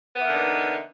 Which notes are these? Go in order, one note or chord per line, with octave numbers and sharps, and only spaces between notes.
D3 E3 A#3 B3 D#4